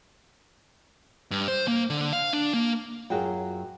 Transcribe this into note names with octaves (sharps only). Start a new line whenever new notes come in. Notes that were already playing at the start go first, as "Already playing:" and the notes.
G2
C5
A#3
D3
F5
D4
A#3
F#2 F4 F#4 G#4 G5